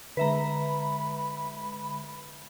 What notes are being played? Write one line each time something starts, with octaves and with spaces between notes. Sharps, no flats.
D3 G#3 B4 E5 A#5 B5